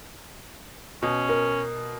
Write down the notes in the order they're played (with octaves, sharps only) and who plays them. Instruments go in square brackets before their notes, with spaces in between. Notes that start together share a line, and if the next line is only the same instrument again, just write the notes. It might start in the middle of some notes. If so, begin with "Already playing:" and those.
[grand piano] B2 [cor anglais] C#4
[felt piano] A#4